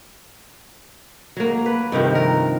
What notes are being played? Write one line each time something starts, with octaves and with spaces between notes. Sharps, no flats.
F#3 A#3
B4
G2 C3 D#3 F3
A#4